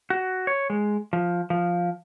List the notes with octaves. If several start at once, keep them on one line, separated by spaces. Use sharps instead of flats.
F#4
C#5
G#3
F3
F3